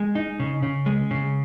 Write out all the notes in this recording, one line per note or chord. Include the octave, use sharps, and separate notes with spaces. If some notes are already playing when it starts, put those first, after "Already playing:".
Already playing: G#3
D#4
C#3
C#3
G#3
C#3